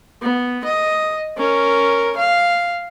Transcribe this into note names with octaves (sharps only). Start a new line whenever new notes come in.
B3
D#5
C#4 A#4
F5